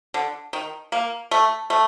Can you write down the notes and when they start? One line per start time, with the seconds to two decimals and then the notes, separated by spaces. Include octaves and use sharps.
0.14 D3
0.53 D#3
0.92 A#3
1.31 A3
1.70 A3